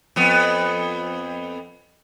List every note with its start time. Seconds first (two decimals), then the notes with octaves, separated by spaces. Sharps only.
0.16 F2 B3